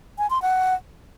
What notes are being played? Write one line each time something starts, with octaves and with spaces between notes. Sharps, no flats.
G#5
C6
F#5